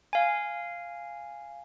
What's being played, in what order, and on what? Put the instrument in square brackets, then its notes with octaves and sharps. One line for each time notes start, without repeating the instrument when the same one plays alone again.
[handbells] F5 G#5